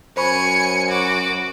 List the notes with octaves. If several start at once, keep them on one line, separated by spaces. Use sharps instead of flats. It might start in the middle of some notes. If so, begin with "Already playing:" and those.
F#2 C5 G#5 B5 C#6 C#7
F#4 D6